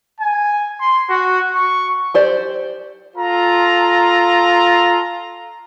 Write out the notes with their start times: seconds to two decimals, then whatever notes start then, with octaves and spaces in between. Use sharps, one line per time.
0.20 G#5
0.80 C6
1.09 F#4
1.55 C#6
2.14 G4 C5 D5
3.16 F4 A4 A#5